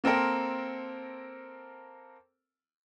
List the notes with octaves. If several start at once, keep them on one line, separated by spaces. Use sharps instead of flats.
A#3 C4 A4 A#4